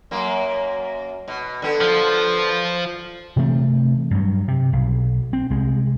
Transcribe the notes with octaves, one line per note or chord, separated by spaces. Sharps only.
F#2 A#3
B2
D3 B3
F3
C3 E3 A3 C4
G2 F#3
C3
B1
C4
C2 G#3